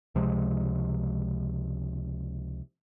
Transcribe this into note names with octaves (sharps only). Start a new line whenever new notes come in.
C#2 C3 F3 G#3